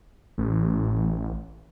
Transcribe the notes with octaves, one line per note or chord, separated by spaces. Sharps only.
A1